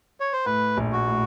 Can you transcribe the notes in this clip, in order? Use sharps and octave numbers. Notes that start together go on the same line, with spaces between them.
C#5
C5
A2 B4
A#1
F#4
A2